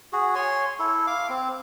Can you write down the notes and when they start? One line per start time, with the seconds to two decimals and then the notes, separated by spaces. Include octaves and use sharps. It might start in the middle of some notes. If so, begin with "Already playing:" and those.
0.13 F#4 G#4
0.35 C#5 G#5 C6
0.79 E4 A4
1.07 F5 D6
1.29 C4